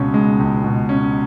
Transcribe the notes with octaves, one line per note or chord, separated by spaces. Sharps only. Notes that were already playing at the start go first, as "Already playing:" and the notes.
Already playing: C#2 B2 C#4
G#3
C#2
B2
C#4